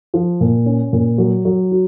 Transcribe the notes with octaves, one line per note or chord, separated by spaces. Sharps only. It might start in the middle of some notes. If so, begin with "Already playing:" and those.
F3
A#2
C#4
A#2
F#3
F#3
F#4